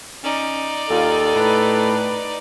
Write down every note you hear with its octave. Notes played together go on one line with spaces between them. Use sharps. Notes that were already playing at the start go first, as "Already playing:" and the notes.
C#4 D#4 D5
D#2 F4 A4
A2 B4